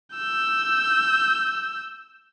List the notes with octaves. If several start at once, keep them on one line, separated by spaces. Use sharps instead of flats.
E6 G6